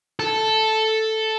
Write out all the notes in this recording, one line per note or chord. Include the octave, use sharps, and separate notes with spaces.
A4